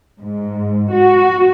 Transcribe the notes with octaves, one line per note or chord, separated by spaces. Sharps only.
G#2
F#4